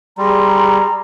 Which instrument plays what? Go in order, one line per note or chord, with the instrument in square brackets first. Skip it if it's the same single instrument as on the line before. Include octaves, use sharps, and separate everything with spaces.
[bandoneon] G3 [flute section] G#4 A#5 C6